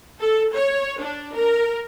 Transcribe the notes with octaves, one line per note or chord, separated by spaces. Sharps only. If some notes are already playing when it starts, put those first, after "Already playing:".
A4
C#5
D4
A#4